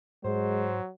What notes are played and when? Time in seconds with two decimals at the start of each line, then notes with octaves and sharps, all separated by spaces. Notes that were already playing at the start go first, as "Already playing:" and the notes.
0.24 G#2 F#3 G#3 C5